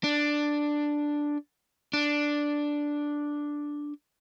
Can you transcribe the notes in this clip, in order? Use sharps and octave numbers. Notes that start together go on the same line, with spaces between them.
D4
D4